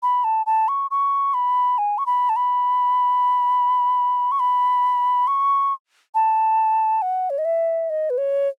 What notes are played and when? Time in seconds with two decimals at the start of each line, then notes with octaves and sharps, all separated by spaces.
0.03 B5
0.24 A5
0.46 A5
0.68 C#6
0.91 C#6
1.34 B5
1.78 G#5
1.98 C#6
2.06 B5
2.29 A5
2.36 B5
4.32 C#6
4.39 B5
5.27 C#6
6.14 A5
7.02 F#5
7.30 C#5
7.38 D#5
7.45 E5
7.90 D#5
8.10 B4
8.18 C#5